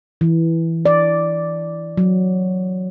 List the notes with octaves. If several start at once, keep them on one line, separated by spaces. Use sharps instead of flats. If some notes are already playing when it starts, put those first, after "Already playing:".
E3
D5
F#3